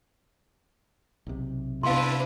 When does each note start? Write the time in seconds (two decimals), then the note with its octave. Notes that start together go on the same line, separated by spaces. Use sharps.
1.27 B1 C3
1.83 C3 B3 D4 E4 B4 F5 C6